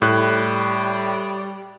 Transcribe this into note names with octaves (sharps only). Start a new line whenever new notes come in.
A2 G3 F#6